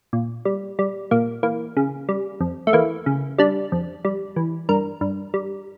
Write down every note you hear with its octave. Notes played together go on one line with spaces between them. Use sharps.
A#2
G3
G3
A#2 A#3
E3 A#3
C#3
G3
F2
A3
E3 A#3
C#3
G3 D4
F2
G3
E3
G2 A#4
G2
G3